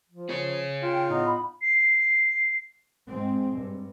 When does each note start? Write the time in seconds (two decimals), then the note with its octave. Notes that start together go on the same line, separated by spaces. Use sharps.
0.09 F3
0.29 G#4 C#5
0.82 F4 G5
1.09 A2 B3 D#4
1.25 B5
1.61 C7
3.07 G#2 G#3 C4
3.56 G2